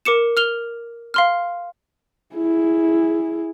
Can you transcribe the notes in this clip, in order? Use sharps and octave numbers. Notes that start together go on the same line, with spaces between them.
A#4 D6 C#7 E7
F6 F7 G7
F5 C6 F6
E4 G#4